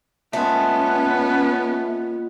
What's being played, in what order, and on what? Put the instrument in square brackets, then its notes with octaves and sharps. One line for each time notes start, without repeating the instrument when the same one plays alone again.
[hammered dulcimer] A#2 G#3 [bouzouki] A3 [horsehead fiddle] B3 [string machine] C#4